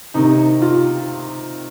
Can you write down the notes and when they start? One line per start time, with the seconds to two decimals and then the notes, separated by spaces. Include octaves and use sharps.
0.14 C3 D#3 D#4
0.62 F4